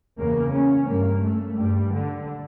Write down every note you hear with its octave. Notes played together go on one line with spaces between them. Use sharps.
E2 C#3 A#3
C#4
G2 A#3
A3
G2 G3
D3